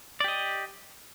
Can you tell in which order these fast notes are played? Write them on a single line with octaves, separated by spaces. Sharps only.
D5 G4 D#5